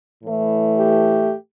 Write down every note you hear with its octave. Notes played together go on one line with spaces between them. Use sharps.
A2 E3 A3
G4